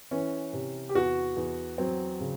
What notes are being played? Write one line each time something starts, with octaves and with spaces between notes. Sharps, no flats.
E3 C#4
C3
G4
E2 F#4
E2
F#3 C4
C#3